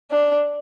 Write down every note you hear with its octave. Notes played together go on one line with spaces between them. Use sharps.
D4